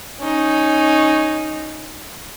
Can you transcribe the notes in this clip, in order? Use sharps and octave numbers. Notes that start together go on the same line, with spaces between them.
C#4 D#4